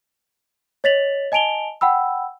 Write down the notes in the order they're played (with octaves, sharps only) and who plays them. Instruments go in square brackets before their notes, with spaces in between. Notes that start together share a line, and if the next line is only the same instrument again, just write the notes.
[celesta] C#5 D#5 A6 B6 F7 F#7
D#5 G#5 A5 D7 F7 G7
F#5 G5 B5 E6